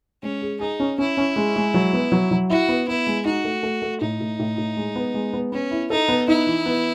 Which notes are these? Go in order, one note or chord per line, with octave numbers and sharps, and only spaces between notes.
G#3 C#4
G#4
D#4 G#4
C#4
C#4 E4
C#4
G#3
G#3
F#3
B3
F#3
F#3
E4 F#4
B3
B3 E4
G#3
D#4 F#4
A3
A3
A3
A2 D#4
A2
A2
A2
G#3
B3
G#3
B3
B3 C#4
E4
D#4 A4
B3
D#4 E4
E3
B3